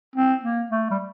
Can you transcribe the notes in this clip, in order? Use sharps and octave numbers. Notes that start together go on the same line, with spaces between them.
C4
A#3
A3
G3